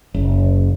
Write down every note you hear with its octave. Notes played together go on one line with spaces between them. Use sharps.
F#1